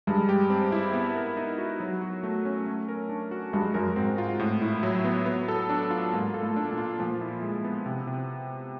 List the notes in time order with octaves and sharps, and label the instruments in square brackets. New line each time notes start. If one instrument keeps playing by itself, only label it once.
[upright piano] G2 [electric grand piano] G#3
[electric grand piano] G4
C4
E4
B3
A#4
D#4
F#4
F#3
F#4
A3
C#4
A3
A#4
D4
F#4
[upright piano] G2 [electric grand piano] G#3
[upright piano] F#2 [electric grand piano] A#4
[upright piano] G#2 [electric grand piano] C4
[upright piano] G#2 [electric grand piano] F4
[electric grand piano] A2
E4
F#3
B3
B3
A4
D4
F4
[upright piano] G#2 [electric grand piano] A#3
[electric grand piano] A4
[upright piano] A2
[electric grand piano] D4
[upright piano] A#2
[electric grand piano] F4
[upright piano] A#2 [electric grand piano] F3
[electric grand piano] E4
G#3
B3
C3
C3